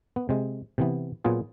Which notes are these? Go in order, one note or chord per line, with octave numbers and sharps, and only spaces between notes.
B3
C3 G#3
C3 E3 B3
A#2 F#3 B3 F4 G#4